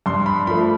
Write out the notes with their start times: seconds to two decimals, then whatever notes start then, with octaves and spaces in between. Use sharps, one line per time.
0.06 G2 C6
0.26 B5
0.47 F3 A3 B5